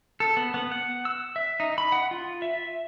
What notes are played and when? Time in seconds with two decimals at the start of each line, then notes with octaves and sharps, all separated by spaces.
0.20 A4
0.37 B3
0.54 B3
0.71 F#5
1.05 E6
1.36 E5
1.60 D#4
1.78 B5
1.92 F#5
2.11 F4
2.42 E5